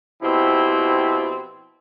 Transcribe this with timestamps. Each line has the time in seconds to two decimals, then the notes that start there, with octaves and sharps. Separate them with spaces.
0.21 B2 F3 C4 E4 G4